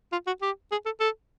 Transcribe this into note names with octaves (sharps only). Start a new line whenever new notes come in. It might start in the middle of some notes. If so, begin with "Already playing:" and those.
F4
F#4
G4
G#4
A4
A4